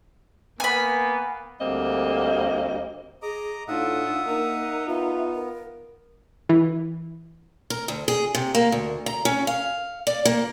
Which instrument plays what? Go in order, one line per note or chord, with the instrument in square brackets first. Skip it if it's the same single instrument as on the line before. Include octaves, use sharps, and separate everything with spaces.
[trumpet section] A#3 B3 [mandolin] G#5 B5
[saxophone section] D2 G3 A#3 C4 D#5
[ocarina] G#4 [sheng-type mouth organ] D#5 A#5 D6
[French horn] A2 [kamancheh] D4 F4 [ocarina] D#4 [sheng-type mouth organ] E5 F#5 D#6
[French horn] A#3 [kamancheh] D#4 [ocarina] A#4
[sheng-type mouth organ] B3 [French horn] F4 [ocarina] E5
[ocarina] A#4
[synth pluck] E3
[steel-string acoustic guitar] A#4
D2
G#4
C3
A#3
D2
A#5
C#4
F5
D5
A#3